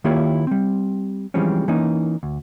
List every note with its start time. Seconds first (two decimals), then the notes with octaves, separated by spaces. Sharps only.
0.04 D#3 A#3 E4 F4 G4 C#5
0.47 G3 C4
1.34 E3 F3 G3 G#3 C4 C#4
1.68 E3 A#3 C#4 D#4
2.23 D2